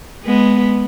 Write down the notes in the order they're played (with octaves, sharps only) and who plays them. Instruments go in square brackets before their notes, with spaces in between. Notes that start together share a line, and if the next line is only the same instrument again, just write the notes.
[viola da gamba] G#3 B3